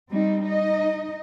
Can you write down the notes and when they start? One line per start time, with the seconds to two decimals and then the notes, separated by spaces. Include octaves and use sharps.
0.10 G3 C4 D#4
0.43 D#4 D#5